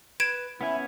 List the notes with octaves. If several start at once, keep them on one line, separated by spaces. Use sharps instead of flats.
B4 G#6 D7 E7
B3 C#4 E4 G#5